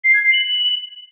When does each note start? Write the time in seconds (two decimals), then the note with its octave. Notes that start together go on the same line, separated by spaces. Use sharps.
0.04 C7
0.14 G#6
0.23 C7
0.32 F#7